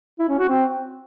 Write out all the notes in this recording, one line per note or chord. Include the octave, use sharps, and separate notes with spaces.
E4
C#4
F#4
C4